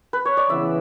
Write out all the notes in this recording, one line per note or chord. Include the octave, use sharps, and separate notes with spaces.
B4
C#5
D5
C#3 E3 B3 E5